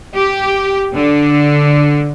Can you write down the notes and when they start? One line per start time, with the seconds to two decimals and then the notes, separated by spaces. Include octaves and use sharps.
0.14 G4
0.96 D3